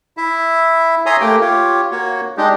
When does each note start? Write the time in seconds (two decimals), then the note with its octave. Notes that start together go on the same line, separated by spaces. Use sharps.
0.17 E4 E5
1.06 C#5 E5 G#5 A#5 C6 D#6
1.20 A3 A#3 G4 G5
1.41 F4 G4 C#5
1.92 A#3 F#4 C#5
2.37 G#3 D4 D#4 G4